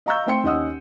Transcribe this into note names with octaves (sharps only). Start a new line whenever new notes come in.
D#5 F5 A#5 C#6 E6 G6
A3 C4 C5 G5 C6 C#7
D#2 C#4 D#5 F#5 D#6 E6